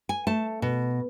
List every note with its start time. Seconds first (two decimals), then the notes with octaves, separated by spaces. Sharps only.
0.09 G#5
0.27 A3 A5
0.62 B2